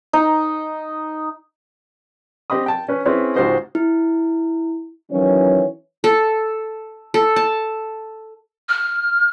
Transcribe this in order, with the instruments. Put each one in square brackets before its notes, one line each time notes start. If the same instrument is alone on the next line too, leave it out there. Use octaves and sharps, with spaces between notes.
[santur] D#4
[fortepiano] C4 G4 D#5 B5 D#6
G5 A5
C#4 B4
C4 C#4 E4 G#4 B4 C#5
C#2 G#2 F#4 G4 C5 D#5
[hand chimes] E4
[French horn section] D#3 E3 F#3 C#4 C#5
[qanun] A4
A4
A5
[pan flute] F6